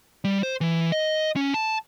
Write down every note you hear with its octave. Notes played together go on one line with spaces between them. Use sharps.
G3
C5
E3
D#5
C#4
A5